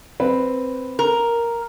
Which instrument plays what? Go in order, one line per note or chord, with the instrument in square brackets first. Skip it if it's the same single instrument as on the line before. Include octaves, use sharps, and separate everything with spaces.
[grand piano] C4 B4
[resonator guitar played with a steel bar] A#4